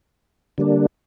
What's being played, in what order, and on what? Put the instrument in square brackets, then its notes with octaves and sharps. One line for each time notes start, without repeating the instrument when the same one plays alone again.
[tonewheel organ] D3 G3 A#3 D4